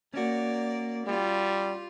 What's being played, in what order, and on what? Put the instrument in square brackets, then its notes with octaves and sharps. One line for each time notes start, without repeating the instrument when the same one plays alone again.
[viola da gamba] A#3 D5 [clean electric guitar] C#4 F#4
[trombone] G3 [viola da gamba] F4